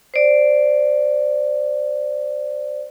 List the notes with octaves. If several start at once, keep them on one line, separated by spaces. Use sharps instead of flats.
C5 D5